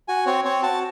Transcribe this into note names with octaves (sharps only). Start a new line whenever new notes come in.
F#4 G#5
C4 C#5
C4 C#5
F#4 A5